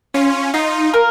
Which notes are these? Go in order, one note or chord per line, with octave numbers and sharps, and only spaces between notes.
C#4 F4
D#4 F4
A#4